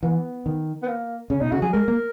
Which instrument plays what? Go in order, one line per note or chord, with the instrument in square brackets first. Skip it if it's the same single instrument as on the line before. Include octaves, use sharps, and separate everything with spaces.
[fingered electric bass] E3 [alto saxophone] B3
[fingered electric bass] D#3
[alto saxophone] B3
A#3
[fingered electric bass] C#3 [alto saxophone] C#4
[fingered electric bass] B2 [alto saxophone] D#4
[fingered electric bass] C#3 [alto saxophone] F#4
[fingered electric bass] F#3 [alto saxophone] G#4
[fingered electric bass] G#3 [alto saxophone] A#4
[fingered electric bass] A#3